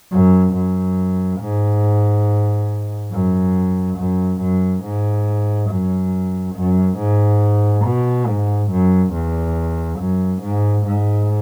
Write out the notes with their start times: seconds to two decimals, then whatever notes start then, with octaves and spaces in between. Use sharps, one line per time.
0.12 F#2
0.54 F#2
1.40 G#2
3.12 F#2
3.98 F#2
4.41 F#2
4.84 G#2
5.70 F#2
6.55 F#2
6.98 G#2
7.85 B2
8.27 G#2
8.71 F#2
9.14 E2
10.00 F#2
10.42 G#2
10.86 G#2